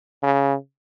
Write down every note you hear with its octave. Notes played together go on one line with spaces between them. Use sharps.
C#3